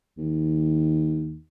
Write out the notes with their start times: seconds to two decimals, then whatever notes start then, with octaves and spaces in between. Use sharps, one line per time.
0.18 D#2